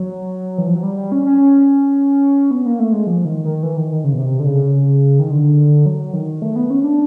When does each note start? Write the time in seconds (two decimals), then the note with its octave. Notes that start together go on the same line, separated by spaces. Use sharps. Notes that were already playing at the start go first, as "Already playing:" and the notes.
Already playing: F#3
0.58 E3
0.66 F3
0.75 F#3
0.83 G3
0.97 G3
1.12 C#4
1.26 C#4
2.51 B3
2.65 A#3
2.79 A3
2.93 G#3
3.07 F3
3.25 D#3
3.45 D#3
3.63 E3
3.77 D#3
3.91 D#3
4.04 C#3
4.13 B2
4.19 C3
4.40 D3
4.46 C#3
5.19 D#3
5.31 D3
5.86 F#3
6.13 D#3
6.42 A3
6.56 B3
6.70 C#4
6.84 D4